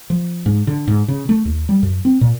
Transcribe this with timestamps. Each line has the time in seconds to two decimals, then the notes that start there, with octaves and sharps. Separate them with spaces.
0.10 F3
0.46 G#2
0.67 D3
0.87 G#2
1.08 C#3
1.29 A3
1.45 D#2
1.69 G3
1.83 F#2
2.05 C4
2.21 A#2